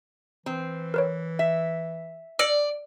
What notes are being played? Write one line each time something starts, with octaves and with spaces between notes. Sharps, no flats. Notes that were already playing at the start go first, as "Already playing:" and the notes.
E3 C4
A#4 B4 C#5
E5
D5 E6 A#6 C#7